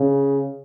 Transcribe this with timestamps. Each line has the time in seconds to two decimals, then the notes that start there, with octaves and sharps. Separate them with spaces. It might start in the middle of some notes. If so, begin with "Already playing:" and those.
Already playing: C#3